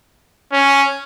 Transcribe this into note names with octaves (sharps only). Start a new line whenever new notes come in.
C#4